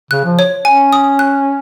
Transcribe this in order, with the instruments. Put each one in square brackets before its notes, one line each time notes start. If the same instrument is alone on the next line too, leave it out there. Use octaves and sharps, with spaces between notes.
[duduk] C#3 [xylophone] F#6
[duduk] F3
[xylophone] C#5
[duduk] C#4 [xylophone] G#5
[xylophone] D#6
F#6